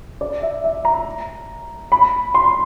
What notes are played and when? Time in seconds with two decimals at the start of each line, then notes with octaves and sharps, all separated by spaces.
0.21 D5
0.42 E5
0.64 E5
0.85 A#5
1.92 B5
2.35 C6